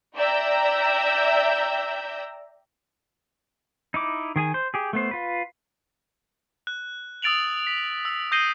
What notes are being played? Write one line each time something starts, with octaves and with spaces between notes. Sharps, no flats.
D5 E5 G5 A#5 E6 G6
D#4 E4 D6
D#3 G#4 G#5
C5
G4 G#4
A3 B3 C5
F4 B4
F#6
D#6 E6 A6 D7 F7 F#7
B6
E6
D#6 G6 A#6 C7 D#7 G7